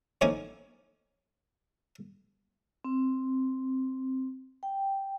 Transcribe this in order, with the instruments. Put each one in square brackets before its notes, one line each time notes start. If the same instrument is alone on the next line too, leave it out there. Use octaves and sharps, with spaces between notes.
[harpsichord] A2 F3 A#3 C#4 D#4 G#5
[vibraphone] C4
G5